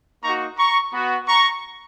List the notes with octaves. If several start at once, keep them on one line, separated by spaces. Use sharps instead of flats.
A#3 D#4 F#4 A#5 C#6
A#5 C#6
B3 F#4
A#5 C#6